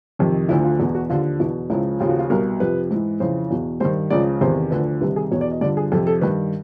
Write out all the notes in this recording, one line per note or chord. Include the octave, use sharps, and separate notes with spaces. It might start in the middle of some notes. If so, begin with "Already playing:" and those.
F2 C3 D#3
D2 D3 F3 E4
F4
E2 B2 F#4
F#4
D#2 D3 F3 F4
E2 B2 E4
C#2 C#3 F3 E4
D#2 C#3 F3 F4
F#4
F4
C2 B2 A#4
F2 C3 F3 B4
G#2 E3
F2 C#3 E3 C5
E2 B2
G2 D#3 C5
C#2 C#3 F3 D5
E2 C3 D#3 C5
D2 D3 F3 B4
C2 C3 D#3 B4
G#4
E2 B2 C#5
D5
D#5
G2 D3 F3 D5
G#4
F2 C3 F3 A4
A4
G2 D#3 B4